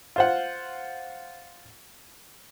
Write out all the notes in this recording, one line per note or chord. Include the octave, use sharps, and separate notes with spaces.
F4 C5 F#5